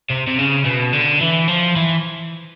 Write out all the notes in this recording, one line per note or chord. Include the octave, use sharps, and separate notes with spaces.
C3
C3
C#3
B2
D3
E3
F3
E3